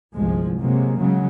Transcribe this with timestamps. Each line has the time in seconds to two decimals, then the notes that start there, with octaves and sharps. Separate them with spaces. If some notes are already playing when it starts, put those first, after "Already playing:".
0.15 G1 C2 F3 G#3
0.61 C3 F#3 G#3 A#3
0.99 C#3 F#3 G#3